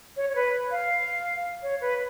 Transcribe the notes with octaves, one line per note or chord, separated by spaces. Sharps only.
C#5
C#5
B4
F5
C#5
B4